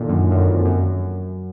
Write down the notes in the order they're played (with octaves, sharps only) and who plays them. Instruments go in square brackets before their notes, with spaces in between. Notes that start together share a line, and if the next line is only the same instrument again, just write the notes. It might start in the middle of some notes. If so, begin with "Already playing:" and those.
Already playing: [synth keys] A#2 D3 D#3
F#2
F#2
F2
F#2